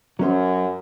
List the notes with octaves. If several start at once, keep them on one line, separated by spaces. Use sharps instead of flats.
F#2 F#3 C#4 C5